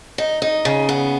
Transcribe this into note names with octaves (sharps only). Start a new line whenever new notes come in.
D#4
D#4
C#3
B3